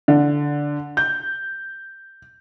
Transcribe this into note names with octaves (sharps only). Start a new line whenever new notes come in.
D3
G6